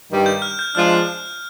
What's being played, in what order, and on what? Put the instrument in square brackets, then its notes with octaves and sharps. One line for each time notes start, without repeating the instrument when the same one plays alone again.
[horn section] G2 D#3 G3
[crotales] G6
F6
G6
[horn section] F3 G#3 D4 F4 [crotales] F6